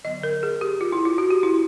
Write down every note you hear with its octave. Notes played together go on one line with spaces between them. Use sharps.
D3 F#3 B3 D#5
A#4
G#4
G4
F4
E4
F4
F#4
G4
E4